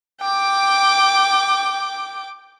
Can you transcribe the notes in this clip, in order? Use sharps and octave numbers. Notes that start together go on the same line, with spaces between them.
G5 D6